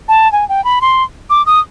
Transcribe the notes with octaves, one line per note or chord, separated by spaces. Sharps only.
A5
G#5
G5
B5
C6
D6
D#6